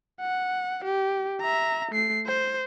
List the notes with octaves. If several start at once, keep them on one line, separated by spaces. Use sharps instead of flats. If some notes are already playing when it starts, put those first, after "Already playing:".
F#5
G4
E5 A#5
A3 C7
C5